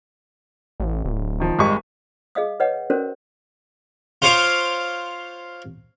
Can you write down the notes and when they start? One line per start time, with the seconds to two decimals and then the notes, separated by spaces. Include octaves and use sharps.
0.80 A1
1.05 D1
1.40 D#3 F3
1.59 G#1 G3 G#3 C#6
2.35 G#4 D#5 F5 D#6
2.60 B4 C#5 D#5 F#5
2.90 C#4 F#4 A4 A#4 C5 D5
4.22 F4 C5 C#5 F5 D6